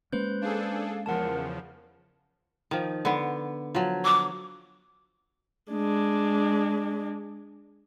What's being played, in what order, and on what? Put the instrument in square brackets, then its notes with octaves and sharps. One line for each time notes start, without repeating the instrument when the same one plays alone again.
[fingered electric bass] G#3 A#3 C#4 [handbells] B4 C5 G6
[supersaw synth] D4 G#4 A4 [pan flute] F5
[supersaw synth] E2 C#3 F3 [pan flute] A#4 [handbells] F#5 A5
[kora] D#3 F3
D3 B3
F3 F#3
[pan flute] D6
[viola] G#3 D4